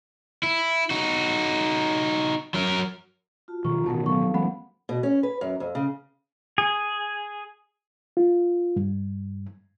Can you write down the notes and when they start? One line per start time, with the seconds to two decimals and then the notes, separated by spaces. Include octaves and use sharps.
0.43 E4
0.90 D#4 F#4
2.54 F#3 A#4
3.48 F4 F#4 A5
3.65 B2 D#3 F3 F4 A#5 C#6
3.86 A1 B2 D#3 D#4 F#4 A#4 F#5 A5
4.06 F#3 B3 A4 F5 A5 C#6
4.34 E3 F#3 G#3 A#3 C4 F#5 B5
4.89 B2
5.03 C#4
5.23 B4
5.41 F#2
5.60 F2
5.75 C#3
6.58 G#4
8.17 F4
8.76 G2